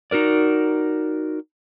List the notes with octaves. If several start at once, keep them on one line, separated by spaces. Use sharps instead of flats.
D#4 F#4 A#4 D5